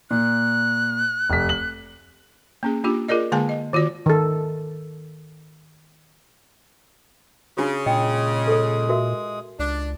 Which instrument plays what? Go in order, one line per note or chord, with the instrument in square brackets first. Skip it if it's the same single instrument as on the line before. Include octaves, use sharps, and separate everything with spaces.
[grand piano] A#2 [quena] F#6
[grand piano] F1 B6
F#7
[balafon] A#3 C#4 G#4
A#3 D4 F4 G4
F4 G#4 A#4 D5 D#5
D3 G#3 A#3 G#4 G#5 A5
D#5
D#3 F4 F#4 D5
[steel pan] D#3 A4
[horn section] C#3 [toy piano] D4 F4 F#4
[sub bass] A#2 [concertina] G#3 D#6 [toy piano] D#5 G5
[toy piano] A4 C#5
F#4 A#4 E5
[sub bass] C#2 [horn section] D4